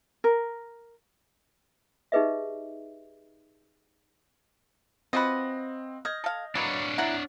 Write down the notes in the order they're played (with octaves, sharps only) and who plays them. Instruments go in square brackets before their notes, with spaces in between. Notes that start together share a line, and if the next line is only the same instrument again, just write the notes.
[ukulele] A#4
[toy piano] D#4 G4 G#4 B4 D#5 E5
[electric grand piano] C4 [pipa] F4 F#4 B4 [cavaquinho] D#5
[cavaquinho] D#5 [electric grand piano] F6 G6 G#6
[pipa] A4 F5
[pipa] F#3 A#3 B3 [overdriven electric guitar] D4 C#5
[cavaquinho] E4 A#5 [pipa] F#5